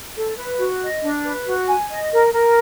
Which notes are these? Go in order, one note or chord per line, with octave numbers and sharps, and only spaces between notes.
A4
B4
F#4
D#5
D4
B4
F#4
G#5
D#5
A#4
A#4